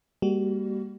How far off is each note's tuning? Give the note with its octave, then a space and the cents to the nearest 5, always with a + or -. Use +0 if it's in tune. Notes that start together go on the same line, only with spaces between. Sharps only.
G3 +30 A#3 +0 F#4 +40